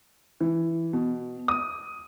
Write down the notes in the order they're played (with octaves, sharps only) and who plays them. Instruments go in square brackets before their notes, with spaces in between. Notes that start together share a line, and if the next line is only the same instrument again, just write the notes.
[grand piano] E3
B2
D#6